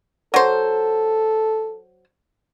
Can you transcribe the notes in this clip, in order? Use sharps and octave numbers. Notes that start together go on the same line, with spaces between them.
F#3 A4 C5